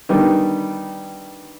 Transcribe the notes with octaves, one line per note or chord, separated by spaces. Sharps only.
D3 D#3 G3 B3 D#4